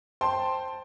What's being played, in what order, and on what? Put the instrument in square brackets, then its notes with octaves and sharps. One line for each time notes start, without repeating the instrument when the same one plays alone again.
[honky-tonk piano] C5 G5 A5 C6